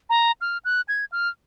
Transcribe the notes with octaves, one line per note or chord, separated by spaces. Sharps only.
A#5
F6
F#6
G#6
F6